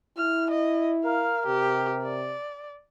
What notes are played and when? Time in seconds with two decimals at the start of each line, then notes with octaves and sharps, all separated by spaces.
0.18 E4 F6
0.51 D#5
1.05 A#4 F5
1.46 C3 G4
2.03 D5